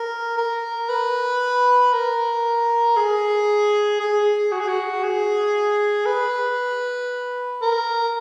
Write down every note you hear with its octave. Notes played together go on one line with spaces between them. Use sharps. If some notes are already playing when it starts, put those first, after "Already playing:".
Already playing: A#4
A#4
B4
A#4
G#4
G#4
F#4
G#4
F#4
G#4
B4
A#4